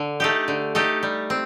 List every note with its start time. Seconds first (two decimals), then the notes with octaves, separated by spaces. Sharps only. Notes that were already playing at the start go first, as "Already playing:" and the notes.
Already playing: D3
0.20 A3 D#4 G4
0.48 D3
0.75 A3 D#4 G4
1.03 G3
1.30 C4